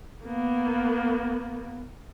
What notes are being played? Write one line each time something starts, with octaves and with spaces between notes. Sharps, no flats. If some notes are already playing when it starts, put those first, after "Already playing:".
A#3 B3